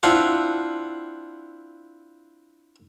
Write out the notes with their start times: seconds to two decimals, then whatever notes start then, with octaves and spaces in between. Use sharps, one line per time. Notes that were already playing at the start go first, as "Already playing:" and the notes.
0.03 C4 D4 E4 F4 F5 F#5